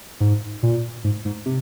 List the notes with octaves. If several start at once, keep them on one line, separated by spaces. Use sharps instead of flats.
G#2
A#2
G#2
G#2
C3